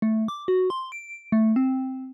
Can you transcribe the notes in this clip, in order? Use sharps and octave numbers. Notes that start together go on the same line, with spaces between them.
A3
D6
F#4
C6
D7
A3
C4